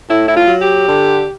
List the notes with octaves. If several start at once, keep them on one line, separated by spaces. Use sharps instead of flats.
A2 E4
E4
F4
F#3
G4
D3